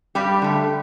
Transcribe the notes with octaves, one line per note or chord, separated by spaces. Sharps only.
G2 G3 G4
D3 A3